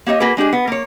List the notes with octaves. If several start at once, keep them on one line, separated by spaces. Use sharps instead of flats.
A#3 G4 C#5 D#5
A#3 F#4 G#4 B4
G#3 D4 G4 G#4
B3
A#3 C#5